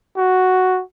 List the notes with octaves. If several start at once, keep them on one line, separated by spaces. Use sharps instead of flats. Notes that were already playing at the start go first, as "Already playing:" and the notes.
F#4